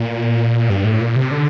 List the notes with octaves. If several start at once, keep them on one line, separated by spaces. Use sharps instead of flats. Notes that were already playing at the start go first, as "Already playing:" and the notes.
Already playing: A#2
G2
A2
A#2
C3
D3